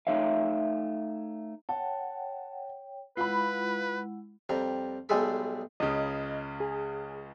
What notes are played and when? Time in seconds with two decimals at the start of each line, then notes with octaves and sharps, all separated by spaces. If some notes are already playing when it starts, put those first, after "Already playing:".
0.07 A3 D#4 C#5 E5 F5
1.69 C#5 F#5 G5 A5
3.17 G#3 E4 F4 B4 F#5 B5
4.49 F2 G3 A#5
5.09 B1 G3 G#3 G#4 A4 B5
5.80 C#2 C#3 D#5
6.60 G#4